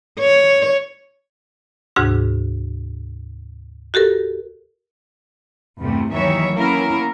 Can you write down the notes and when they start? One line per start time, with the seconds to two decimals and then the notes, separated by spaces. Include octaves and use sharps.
0.19 C#5
1.96 D2 G#2 C3 D4 F#4 G#4
3.94 F#4 G4 A4 A#4
5.80 E2 G2 C3 A3
6.12 D#2 D#3 E3 F#3 C#5 E5
6.54 A#3 B3 C#4 E4 A#4